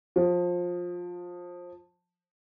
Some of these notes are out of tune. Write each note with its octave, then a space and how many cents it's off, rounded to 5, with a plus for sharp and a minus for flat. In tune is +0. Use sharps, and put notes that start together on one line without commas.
F3 +20